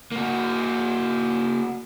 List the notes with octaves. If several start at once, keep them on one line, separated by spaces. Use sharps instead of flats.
A#3 F#4